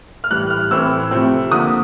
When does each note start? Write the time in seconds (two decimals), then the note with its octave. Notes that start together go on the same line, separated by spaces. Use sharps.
0.24 F6
0.30 A2 E3 G3 F#6
0.50 F6
0.71 A2 E3 A3 C4 E6
1.11 C3 F3 A3 C4
1.51 D3 F3 A#3 D#6